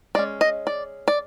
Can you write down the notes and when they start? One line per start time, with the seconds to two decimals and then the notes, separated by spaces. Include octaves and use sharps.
0.15 G#3 C#4 D5
0.41 D#5
0.67 D5
1.08 D5